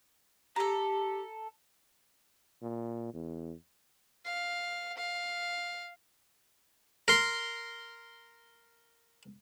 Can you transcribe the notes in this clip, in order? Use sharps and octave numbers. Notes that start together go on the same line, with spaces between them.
G4 A4 A#5
A#2
E2
F5
F5
A#4 C6